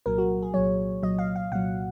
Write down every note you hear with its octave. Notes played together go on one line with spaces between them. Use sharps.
C2 A#2 F#3 A#4
F#4
G#4
C2 A#2 F#3 C#5
C2 A#2 F#3 D#5
F5
F5
C2 A#2 F#3 F#5